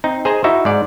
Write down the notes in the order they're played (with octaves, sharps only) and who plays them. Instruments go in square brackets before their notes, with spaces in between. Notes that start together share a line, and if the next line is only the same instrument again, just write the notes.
[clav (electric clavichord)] C4 D#4
G#4 C5 D#5 G#5 A#5
D#4 E4 F#4 E5
G#2 D5